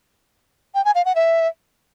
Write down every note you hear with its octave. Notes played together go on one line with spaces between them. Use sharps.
G5
G#5
F5
F#5
E5